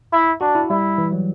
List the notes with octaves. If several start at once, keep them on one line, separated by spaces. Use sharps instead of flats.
E4
D4 F#4
E4
G3 E4
E3
F#3